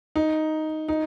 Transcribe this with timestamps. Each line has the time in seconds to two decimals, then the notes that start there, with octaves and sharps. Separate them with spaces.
0.16 D#4
0.89 D#4